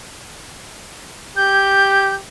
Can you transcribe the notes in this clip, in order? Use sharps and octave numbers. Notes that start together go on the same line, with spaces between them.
G4 G6